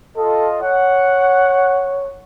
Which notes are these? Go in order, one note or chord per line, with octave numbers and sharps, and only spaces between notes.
F4 A4 D#5
C#5 F#5